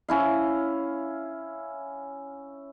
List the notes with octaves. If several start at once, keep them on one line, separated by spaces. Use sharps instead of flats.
C#4 E4 F5